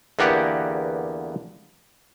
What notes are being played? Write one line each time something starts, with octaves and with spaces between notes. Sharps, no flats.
E2 D3 A#3 B3 G4 F#5